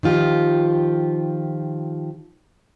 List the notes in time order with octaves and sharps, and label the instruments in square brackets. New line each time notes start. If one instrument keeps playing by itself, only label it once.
[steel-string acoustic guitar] D#3 F3 F4 G4